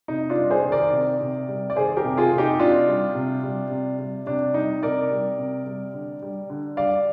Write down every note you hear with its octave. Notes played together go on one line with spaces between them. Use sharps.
C3 D#4
D4 F4
G3
G#4 C5
D#3
A#4 D5
C3
C3
G3
D5
D#3 G#4 C5
G4 A#4
C3
F4 G#4
C3
D#4 G4
C3 D4 F4
G3
C3
G3
C3
G3
C3 D4
G3 D#4
C3 A#4 D5
G3
C3
G3
D3
G3
D3
G3 D5 F5